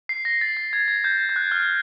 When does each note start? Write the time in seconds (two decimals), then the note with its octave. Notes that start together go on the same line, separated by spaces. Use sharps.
0.09 C7
0.25 A#6
0.41 A6
0.57 A6
0.73 G#6
0.88 G#6
1.04 G6
1.29 G6
1.36 F#6
1.51 F6